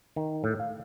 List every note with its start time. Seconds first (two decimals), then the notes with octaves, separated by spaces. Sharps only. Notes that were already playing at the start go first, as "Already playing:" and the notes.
0.16 D#3
0.44 A2
0.60 F5